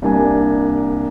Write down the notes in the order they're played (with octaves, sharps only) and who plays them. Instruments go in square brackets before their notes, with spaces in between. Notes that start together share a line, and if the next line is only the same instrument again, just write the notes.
[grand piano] C2 A#3 D4 G#5